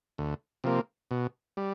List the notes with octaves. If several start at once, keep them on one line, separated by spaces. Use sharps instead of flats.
D2
C3 F3 A#3
B2
G3